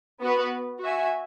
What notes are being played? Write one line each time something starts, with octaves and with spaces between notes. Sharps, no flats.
B3 F#4 B4
F#4 E5 G#5